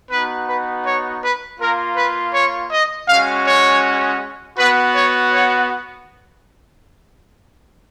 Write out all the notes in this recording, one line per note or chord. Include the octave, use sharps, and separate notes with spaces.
B3 D#4 F#4 B4
B4
C#5
B4
A#3 F4 A#4
B4
C#5
D#5
G#3 C#4 F#4 F5
C#5
B3 F#4 B4
C#5
C#5